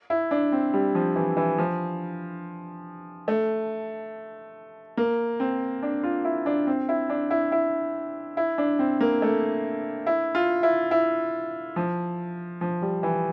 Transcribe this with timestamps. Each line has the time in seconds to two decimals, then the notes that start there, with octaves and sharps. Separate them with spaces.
0.10 E4
0.31 D4
0.52 C4
0.73 G3
0.95 F3
1.16 E3
1.37 E3
1.58 F3
3.28 A3
4.97 A#3
5.40 C4
5.83 D4
6.03 F4
6.25 E4
6.46 D4
6.67 C4
6.89 E4
7.10 D4
7.31 E4
7.52 E4
8.37 E4
8.58 D4
8.79 C4
9.00 A#3
9.22 A3
10.06 E4
10.35 F4
10.63 E4
10.91 E4
11.76 F3
12.61 F3
12.82 G3
13.03 E3